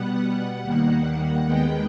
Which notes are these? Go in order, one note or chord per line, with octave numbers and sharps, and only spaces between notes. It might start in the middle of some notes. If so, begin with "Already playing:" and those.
Already playing: B2 G3 B3 F#5
D#2 D#3 G3 A#3
D#2 D#3 G#3 B3 G5